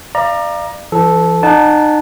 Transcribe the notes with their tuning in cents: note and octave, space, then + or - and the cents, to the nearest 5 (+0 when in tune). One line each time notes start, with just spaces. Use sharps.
D5 +30 F5 -30 A#5 +10
E3 +40 A4 -10
D#4 -40 F#5 -5 A5 -25